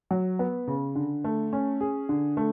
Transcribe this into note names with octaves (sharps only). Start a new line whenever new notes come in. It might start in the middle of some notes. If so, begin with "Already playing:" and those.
F#3
B3
C#3
D3
A3
C#4
G#4
D3
A3